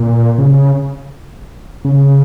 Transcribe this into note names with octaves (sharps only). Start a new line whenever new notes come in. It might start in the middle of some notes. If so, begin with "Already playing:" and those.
Already playing: A#2
C#3
C#3